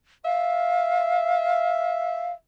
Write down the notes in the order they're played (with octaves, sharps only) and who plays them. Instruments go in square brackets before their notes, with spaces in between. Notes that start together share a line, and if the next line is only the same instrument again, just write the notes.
[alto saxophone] E5 [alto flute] F5